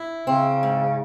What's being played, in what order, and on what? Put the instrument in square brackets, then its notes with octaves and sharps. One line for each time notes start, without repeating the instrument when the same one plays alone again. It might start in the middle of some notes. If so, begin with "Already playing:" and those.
Already playing: [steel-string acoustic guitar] E4
[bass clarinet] C#3 [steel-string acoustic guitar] C4
[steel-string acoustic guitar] G#2